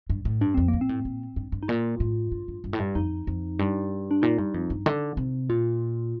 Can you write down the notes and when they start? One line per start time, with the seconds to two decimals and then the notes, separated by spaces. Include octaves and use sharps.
0.10 G2
0.25 A2
0.41 G2 D4
0.54 F2 C4
0.68 A#3
0.73 A#2
0.81 C4
0.89 A2
1.05 A#2
1.36 G2
1.52 G2
1.63 D#4
1.68 A#2 F4
2.00 A2
2.32 G2
2.48 G2
2.64 G2
2.73 A2
2.79 G2
2.95 F2 D#4
3.27 F2
3.59 G2
4.11 D4
4.22 A#2 D#4
4.38 G2
4.54 F2
4.70 G2
4.86 D3
5.17 C3
5.49 A#2 F4